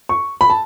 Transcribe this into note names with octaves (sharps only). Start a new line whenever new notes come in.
C#6
B5
A5